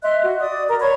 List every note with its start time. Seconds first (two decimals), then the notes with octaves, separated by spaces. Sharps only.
0.02 D#5 E5 C6 F#6
0.23 F#4
0.40 D5 D#6
0.68 A#4 A#5
0.80 C#5 B5 C#6 G#6